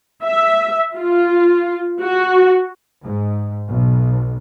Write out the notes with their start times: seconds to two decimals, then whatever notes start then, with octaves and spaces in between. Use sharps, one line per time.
0.24 E5
0.96 F4
2.02 F#4
3.04 G#2
3.69 B1